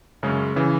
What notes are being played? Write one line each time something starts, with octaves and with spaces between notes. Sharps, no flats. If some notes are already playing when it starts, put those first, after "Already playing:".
F#2 C#3 G#3 C#4
C#3 E3